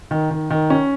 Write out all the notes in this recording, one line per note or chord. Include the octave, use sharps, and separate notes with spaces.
D#3
D#3
D#3
C#4